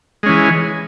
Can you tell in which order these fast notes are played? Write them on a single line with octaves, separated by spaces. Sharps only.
G#3 C#4 E3